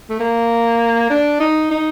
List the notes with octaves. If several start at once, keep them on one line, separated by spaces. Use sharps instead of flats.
A3
A#3
D4
D#4
D#4